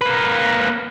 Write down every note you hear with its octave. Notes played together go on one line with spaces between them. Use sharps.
A#3 B4